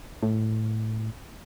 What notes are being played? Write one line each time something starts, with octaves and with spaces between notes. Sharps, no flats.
A2